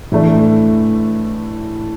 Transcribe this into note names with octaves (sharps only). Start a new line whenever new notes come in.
A2 E3 A3 D4